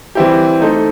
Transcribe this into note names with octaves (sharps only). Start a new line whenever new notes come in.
E3 G3 C4 E4 G4
A3 D#4 A4 C5